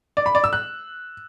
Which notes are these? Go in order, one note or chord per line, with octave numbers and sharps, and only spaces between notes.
D5
B5
D5
E6
F#6